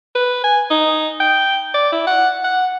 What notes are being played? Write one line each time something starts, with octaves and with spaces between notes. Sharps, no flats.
B4
G#5
D#4
G5
D5
E4
F#5
F#5